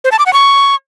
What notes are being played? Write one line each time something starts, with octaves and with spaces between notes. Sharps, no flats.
C5
A5
D6
F#5
C#6